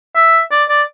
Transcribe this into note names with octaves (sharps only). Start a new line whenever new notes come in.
E5
D5
D5